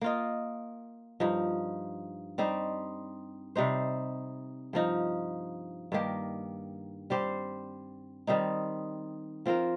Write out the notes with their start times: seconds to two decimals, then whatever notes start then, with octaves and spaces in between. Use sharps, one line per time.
0.01 A#3 F4 D#5
1.20 G2 F3 D#4
2.38 G3 C4 D#4 G4
3.56 C3 G3 D#4 C5
4.73 G2 F3 D#4
5.92 G2 D#3 A#3 G4
7.10 G3 C4 G4 C5
8.27 D#3 G3 C4 D#4
9.46 F3 C4 F4 A#4